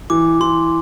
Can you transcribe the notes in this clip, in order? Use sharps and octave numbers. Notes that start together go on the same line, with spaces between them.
E3 D6
E3 C6